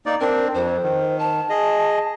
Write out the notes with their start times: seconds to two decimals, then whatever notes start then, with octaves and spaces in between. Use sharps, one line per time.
0.06 A#3 D#4 D5
0.21 C4 D4 A#4
0.54 F2 C5
0.83 D#3
1.19 A5
1.50 G#4 D#5